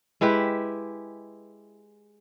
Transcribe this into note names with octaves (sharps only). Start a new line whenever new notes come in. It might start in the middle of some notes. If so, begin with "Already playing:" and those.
G#3 E4 G4 B4